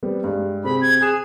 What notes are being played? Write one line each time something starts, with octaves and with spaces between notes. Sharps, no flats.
G3 B3 C4
G2 G3 G#3
C3 C4 G#4 B5
G#6
G#4 F#6 E7